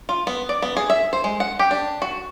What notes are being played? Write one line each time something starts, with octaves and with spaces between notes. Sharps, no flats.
F4
B3
D5
B3
G#4
E5
C5
G#3
F#5
G4
D4
F#4